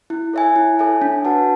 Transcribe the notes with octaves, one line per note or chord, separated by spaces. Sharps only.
E4
A4 C#5 E5 G#5
E4
A4 C#5 E5 G#5
D4
F#4 B4 F#5 A5